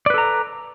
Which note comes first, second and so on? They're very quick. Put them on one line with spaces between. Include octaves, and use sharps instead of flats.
D5 B4 A4 A#5